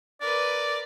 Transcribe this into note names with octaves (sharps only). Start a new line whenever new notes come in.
A#4 B4 D5